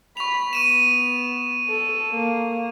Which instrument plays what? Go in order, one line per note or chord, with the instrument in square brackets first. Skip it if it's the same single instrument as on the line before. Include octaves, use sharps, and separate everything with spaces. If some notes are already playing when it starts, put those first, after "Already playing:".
[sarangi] B5 [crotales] C#6 F7
[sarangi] B3 [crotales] C#6 D#7 E7
[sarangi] A4
A#3